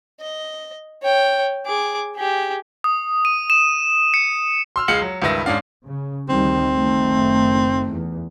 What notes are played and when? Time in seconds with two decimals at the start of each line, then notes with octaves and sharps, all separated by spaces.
0.20 D#5
1.02 C#5 G5
1.66 G#4 D6
2.16 G4 G#4
2.84 D#6
3.25 D#7
3.50 E7
4.14 C#7
4.76 C6 E6 F6
4.88 C#2 G#3 F5 C#7 F#7
5.02 F#3
5.22 C#2 G2 D#3 B4 E5 A#6
5.46 G#2 C#4 D4 F5
5.85 C#3
6.29 D2 D#3 G3 C4
6.74 F#1 D#3 A3
7.89 E2